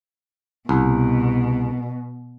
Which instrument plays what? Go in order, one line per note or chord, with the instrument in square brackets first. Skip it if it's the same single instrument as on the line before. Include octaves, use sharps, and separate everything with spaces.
[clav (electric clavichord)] C2 [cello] B2